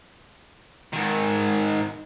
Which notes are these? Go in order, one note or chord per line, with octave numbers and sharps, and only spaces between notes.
G#2 D#3